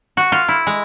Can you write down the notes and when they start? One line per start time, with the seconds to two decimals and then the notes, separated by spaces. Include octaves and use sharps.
0.17 F#4
0.32 F4
0.48 E4
0.67 G#3